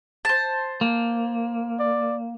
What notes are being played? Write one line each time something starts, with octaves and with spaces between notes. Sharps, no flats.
C5 A5
A#3
D5